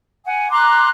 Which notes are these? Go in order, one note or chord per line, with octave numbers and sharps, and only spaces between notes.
F#5 G#5
A#5 C6 D6 F#6